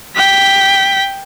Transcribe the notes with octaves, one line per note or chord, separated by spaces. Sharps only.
G5 B6